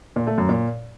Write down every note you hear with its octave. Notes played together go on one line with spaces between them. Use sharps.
A#2
A3
F#2
A#2